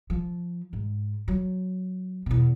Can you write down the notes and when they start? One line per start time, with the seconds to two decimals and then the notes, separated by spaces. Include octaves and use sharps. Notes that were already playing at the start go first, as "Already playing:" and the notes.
0.10 F3
0.73 G#2
1.28 F#3
2.26 E2 B2